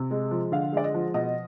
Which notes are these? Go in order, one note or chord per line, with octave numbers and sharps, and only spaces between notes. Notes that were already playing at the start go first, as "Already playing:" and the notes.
Already playing: C3
G#3
F3
D3 F5
G#3 D5
D#5
F3
B2 D#5